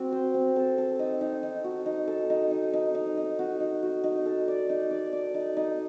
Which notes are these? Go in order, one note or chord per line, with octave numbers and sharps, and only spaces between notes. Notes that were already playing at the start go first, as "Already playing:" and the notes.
Already playing: C4 F#4
C5
C4
A4
A4
D#4
D#4
D#4
F#4
D#4
A4
D#4
D#4
D#4
D#4
D#4
F#4
D#4
F#4
D#4
A4
D5
D#4
D5
D5
D#4
D#4